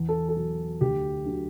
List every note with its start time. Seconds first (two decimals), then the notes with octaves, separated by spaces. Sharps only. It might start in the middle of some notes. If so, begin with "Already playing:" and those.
Already playing: E2
0.09 A4
0.29 A4
0.37 B2 F#3
0.81 D2 G4
1.26 D3 F#3